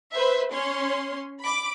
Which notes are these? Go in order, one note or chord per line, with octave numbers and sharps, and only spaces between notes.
B4 C5 E5
C#4 C#5 C6
B5 D6